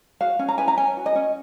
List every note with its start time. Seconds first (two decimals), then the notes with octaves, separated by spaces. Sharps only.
0.20 F#4 F5
0.39 C#4
0.48 A#5
0.58 B4 G#5
0.68 A#5
0.78 C#4 G#5
0.97 F#4
1.06 D#5
1.15 C#4